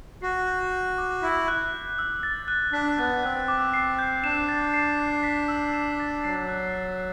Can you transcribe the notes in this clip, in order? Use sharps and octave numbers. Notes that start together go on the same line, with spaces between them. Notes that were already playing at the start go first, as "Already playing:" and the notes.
F#4 C7
G6
G6
D6
E4 B6
F#6
G6
E6
A6
F#6
D4 B6
B3 F#6
C4 F#6
D6
C7
G6
D4 E7
A6
C7
A6
B6
E6
E7
A6
F#3 C7
F#6
C7